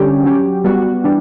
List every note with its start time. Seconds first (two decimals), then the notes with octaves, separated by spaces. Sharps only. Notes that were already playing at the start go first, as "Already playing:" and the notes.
Already playing: D3 G3 C#4 G4
0.24 F#3 C#4 G4
0.64 G3 B3 F#4
1.04 E3 G3 D4